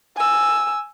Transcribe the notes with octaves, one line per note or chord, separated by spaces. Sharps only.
G#5 E6